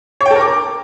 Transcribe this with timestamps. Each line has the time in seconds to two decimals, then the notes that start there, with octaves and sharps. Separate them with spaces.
0.21 C#5
0.26 G5
0.31 A4
0.36 A#4
0.41 D6